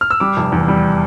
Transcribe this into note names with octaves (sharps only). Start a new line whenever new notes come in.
F6
E6
G3 D6
F1
E2
G3